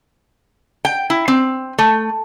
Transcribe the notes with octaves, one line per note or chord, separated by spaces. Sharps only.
G5
E4
C4
A3